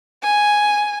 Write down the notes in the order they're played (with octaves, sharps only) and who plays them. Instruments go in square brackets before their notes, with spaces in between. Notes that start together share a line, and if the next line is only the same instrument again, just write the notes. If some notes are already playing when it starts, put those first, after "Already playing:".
[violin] G#5